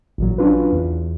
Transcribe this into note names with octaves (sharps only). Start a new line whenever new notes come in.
A1 A#2 F#3
F#3 C#4 D4 F4 B4
E2